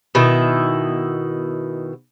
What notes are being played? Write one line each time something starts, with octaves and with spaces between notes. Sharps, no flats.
B2 D#3 E4